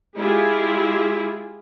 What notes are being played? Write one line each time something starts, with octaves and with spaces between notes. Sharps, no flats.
G#3 E4 F4 G4 G#4